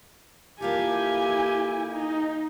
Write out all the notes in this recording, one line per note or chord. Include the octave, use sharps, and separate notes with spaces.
A#3 E4 F4 G4 A4 G#5
D#4